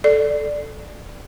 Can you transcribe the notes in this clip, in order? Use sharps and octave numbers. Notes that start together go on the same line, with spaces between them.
A4 D5